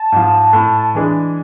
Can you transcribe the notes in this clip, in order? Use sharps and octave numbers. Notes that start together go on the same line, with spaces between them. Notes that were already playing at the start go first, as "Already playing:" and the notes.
Already playing: A5
G#2 F3
A2
E3 G#3 D4